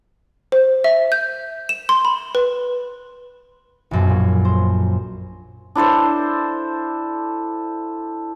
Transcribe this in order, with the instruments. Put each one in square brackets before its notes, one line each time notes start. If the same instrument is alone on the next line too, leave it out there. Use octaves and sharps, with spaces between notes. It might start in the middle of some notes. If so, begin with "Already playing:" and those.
[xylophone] C5
E5
G6
E7
C6
B5
B4
[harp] A#1 F#2 B2
A#2
C5
[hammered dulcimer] D4 E4 A4 C5